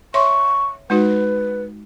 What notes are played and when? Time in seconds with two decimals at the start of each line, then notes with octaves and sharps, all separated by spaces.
0.14 C#5 E5 C6 C#6
0.90 G#3 D#4 F#4 B4